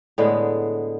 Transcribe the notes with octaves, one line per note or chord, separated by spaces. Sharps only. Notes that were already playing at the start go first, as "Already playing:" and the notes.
A2 D3 G#3 B3